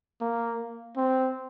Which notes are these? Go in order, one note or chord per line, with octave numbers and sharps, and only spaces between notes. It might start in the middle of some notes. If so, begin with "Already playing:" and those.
A#3
C4